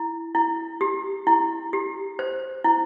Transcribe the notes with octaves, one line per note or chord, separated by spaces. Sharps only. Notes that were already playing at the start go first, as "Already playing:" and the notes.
Already playing: E4
E4
G4
E4
G4
C5
E4